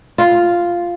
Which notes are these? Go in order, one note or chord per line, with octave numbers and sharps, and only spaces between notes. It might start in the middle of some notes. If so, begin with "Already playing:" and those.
F4